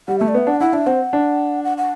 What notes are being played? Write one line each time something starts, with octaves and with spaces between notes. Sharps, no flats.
G3 F#5
A3 E5
D5
B3 E5
D4 F#5
E4 F#5
D4 E5
C4 F#5
D4
F#5
F#5